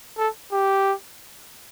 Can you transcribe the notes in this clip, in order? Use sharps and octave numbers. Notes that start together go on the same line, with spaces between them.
A4
G4